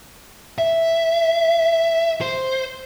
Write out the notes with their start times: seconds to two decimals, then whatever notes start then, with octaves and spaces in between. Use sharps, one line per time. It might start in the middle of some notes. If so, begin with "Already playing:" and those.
0.58 E5
2.21 C5